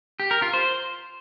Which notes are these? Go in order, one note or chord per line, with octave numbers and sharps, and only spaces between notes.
G4
A#4
F4
C5